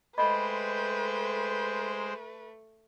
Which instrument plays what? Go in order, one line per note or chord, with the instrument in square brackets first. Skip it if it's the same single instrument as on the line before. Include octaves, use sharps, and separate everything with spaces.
[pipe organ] G#3 C5 G5 [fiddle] A3 [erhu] B4 [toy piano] D#5 B5